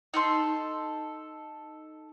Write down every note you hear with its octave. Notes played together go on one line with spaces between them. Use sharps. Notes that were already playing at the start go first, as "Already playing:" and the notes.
D#4 A4 C6